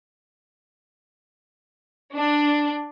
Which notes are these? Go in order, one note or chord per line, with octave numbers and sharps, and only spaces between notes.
D4